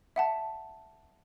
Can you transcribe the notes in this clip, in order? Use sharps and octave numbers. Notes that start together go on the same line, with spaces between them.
E5 F#5 A5